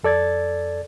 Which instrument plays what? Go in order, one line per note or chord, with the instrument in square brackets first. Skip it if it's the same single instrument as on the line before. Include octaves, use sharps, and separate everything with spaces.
[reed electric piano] F2 A4 D5 G#6 A6